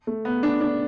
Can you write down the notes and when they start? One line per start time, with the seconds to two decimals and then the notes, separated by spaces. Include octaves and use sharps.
0.07 A3
0.25 B3
0.43 D4
0.61 D4